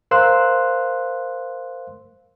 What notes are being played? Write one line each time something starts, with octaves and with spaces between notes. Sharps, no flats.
A#4 C5 F5 C6 E6 F#6